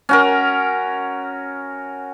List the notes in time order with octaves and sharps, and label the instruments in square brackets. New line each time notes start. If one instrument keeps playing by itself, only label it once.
[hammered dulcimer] C#4 F#4 A#4